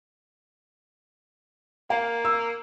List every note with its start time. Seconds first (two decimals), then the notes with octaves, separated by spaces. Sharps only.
1.90 A#3 F5
2.25 E6